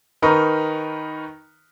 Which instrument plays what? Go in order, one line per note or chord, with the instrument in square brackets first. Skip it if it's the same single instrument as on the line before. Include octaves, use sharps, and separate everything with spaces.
[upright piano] D#3 D#4 A#4 B4 C#6